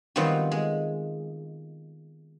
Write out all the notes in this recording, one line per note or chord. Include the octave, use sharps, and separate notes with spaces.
D#3 F#3 G3 B3 C4 F4
G#3